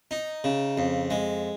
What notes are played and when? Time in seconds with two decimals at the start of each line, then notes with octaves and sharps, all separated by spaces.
0.11 D#4
0.44 C#3
0.78 F2
1.10 G#3